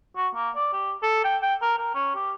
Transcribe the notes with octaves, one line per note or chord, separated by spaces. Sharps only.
F#4
A#3
D5
G4
A4
G5
G5
A#4
A#4
C#4
G4